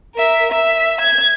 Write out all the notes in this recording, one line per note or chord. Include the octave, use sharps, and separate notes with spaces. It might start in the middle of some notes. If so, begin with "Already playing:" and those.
A#4 E5
E5
G#6